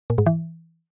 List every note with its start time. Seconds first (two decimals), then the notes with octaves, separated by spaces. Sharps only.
0.10 A#2
0.18 G#2
0.26 E3